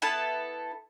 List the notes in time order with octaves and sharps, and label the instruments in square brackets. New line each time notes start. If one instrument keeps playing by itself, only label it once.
[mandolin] B3 E4 A4 A5